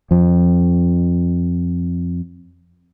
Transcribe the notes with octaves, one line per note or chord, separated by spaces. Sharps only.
F2 F3